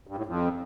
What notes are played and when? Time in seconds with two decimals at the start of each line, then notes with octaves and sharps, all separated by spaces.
0.07 G2
0.16 A2
0.26 F2